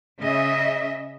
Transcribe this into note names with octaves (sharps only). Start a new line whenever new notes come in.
C#3 D#5 E5